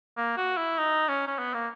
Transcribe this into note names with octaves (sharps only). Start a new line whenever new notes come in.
A#3
F#4
E4
D#4
C#4
C#4
B3
A#3